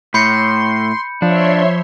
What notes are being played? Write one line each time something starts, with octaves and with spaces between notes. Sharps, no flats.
A2 B5 C6 G6 C#7
F3 D4 C#5 E5 C6